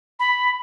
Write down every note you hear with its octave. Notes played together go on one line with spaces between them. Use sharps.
B5